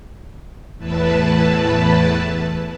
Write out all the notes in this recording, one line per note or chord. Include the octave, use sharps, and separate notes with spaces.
E2 A2 E4 B4 A5